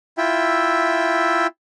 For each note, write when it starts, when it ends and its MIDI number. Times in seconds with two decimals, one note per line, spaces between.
0.18 1.47 64
0.18 1.47 65
0.18 1.47 76
0.18 1.47 79